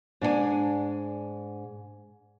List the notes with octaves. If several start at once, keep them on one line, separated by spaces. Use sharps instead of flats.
G#2 D4 G#4 G#5